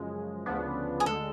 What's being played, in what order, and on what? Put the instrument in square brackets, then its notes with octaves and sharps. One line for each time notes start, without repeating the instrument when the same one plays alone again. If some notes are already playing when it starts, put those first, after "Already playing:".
Already playing: [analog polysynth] F#2 C#3 F3 G#3
D2 C#3 F3 B3 D4
[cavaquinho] G#4
[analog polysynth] D2 D3 G#3 [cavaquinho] A4